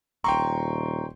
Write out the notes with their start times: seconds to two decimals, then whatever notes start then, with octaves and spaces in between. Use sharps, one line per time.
0.24 D#1 G5 A#5 C6 C#6